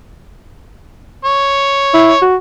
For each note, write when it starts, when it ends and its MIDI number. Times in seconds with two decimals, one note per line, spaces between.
1.25 2.22 73
1.94 2.12 64
2.22 2.36 66